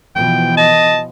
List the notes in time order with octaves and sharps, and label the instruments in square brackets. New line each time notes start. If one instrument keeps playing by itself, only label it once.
[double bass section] B2 E3 F3 [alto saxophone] G5
[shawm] D#5 [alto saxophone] A5